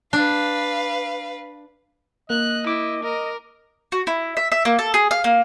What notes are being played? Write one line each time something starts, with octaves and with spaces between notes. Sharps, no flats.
D4 B4 F5
A#3 D#5 F#6
E4 D6
A#4 D#5
F#4
E4
E5
E5
A#3
A4
G#4
F5
A#3